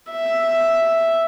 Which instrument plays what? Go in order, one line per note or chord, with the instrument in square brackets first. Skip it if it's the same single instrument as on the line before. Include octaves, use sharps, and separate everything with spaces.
[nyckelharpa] E5